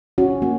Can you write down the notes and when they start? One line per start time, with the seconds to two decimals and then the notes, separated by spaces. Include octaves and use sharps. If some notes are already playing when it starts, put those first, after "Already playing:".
0.18 C#4 F#4
0.42 A#3 F#4